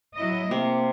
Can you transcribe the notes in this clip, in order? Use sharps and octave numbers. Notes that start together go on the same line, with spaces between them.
F#3 E4 D#5
C3 A#3